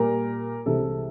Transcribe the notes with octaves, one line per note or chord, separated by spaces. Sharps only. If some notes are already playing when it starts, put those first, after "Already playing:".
Already playing: A#2 G3 A#3 A#4
C2 C3 E3 G#3 A4